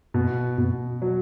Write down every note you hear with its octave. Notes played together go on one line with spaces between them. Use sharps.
B2
B2
F#3